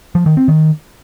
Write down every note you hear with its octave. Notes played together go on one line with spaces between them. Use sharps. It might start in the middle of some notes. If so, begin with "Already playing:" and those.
F3
D#3
C4
D#3